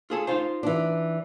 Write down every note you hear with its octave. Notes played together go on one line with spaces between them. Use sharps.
F4 G#4 A4
D#4 F4 C5
E3 D4